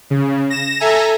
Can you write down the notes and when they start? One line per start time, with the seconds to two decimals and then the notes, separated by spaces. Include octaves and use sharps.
0.10 C#3
0.50 A#6 E7
0.80 A4 E5 G#5 A#5